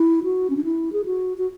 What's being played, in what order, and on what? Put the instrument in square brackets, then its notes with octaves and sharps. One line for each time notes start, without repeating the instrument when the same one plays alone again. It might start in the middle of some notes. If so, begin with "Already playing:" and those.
Already playing: [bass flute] E4
F#4
C#4
D4
E4
G#4
F#4
F#4